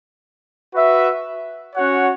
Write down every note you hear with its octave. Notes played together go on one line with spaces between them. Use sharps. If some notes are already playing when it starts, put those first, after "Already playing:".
F#4 B4 E5
C#4 F#4 C#5 F#5